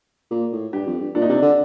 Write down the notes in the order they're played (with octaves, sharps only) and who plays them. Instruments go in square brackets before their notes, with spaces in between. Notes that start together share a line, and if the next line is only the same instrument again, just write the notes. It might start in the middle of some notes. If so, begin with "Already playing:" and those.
[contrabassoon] A#2
A2
[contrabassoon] G2 [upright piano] G4
[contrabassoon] F2
G2
[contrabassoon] A#2 [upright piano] D4
[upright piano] D#4
[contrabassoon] C3 [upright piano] D4
[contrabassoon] D3